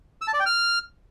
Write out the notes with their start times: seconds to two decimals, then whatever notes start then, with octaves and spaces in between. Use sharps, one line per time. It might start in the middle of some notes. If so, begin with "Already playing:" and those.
0.22 E6
0.28 A5
0.34 D5
0.40 G5
0.46 F6